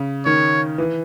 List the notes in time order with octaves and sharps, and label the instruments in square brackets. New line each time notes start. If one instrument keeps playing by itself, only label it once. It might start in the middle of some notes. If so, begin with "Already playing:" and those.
Already playing: [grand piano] C#3
[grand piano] D#3 [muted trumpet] C#5
[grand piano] E3